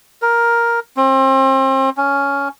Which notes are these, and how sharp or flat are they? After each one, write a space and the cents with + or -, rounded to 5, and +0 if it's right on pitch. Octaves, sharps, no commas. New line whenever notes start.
A#4 +5
C4 +35
C#4 +10